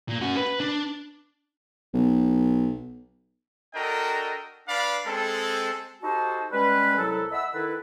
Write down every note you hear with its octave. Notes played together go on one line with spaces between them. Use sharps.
A#2
C#4 F#4
B4
D4
B1
D4 F#4 A4 A#4 D#5 G5
D4 B4 D5 F5 B5
G#3 C4 A4
D#4 F#4 G4 A4 C5 A5
G3 G#3 C#4 B4
C2 F#3 E4 A4
D#5 E5 F#5 B5 E6
D#3 E4 A4 B4